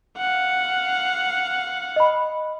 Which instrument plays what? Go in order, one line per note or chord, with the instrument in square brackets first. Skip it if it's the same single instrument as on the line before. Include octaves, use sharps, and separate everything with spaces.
[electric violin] F5 F#5
[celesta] D#5 B5